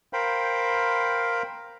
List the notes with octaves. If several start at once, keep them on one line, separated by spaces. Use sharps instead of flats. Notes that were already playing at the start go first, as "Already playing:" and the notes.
A#4 C5 F5 G5 B5